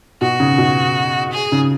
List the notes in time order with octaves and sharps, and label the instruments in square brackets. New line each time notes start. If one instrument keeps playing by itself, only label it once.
[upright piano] B2 [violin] F#4
[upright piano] C#3
B2
[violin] G#4
[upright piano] C#3